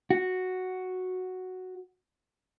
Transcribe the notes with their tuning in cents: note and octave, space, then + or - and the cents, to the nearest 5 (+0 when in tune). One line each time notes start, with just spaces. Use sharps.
F#4 +0